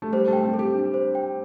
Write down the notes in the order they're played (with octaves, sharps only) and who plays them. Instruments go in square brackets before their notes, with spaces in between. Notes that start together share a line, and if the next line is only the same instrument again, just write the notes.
[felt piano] A3
[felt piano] G3 [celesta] C5
[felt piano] A3
[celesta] G5
[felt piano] C4
[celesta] A4
[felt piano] G4
[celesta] D4
C5
G5